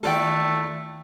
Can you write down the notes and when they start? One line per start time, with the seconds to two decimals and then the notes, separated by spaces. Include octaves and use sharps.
0.03 D#2 A3 F4 A4 D5 G5